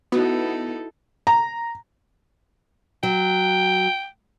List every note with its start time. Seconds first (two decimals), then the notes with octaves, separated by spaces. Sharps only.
0.12 B3 D#4 E4 F#4 A4
1.27 A#5
3.03 F#3 G5